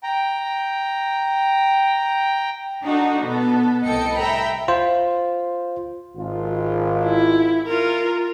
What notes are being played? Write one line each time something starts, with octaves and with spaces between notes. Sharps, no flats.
G5 A#5
D4 D#4 F#4 A4
B2 B3 A4
C2 A2 A4 D#5 G5 C#7
E5 G5 A#5 B5
F4 C5
G#1 F4
E4
F4 A#4